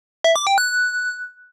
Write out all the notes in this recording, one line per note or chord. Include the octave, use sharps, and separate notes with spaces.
E5
D6
G5
F#6